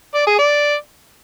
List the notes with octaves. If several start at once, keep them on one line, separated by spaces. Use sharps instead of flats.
D5
G#4
D5